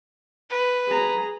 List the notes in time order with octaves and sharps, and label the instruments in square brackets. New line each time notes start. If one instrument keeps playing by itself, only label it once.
[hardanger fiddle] B4
[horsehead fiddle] G#4 A#5